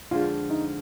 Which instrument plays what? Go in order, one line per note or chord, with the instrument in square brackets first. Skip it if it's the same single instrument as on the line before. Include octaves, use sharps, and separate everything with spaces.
[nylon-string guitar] F2 D3 F3 G#3 D4 [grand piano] F4
[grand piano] D#4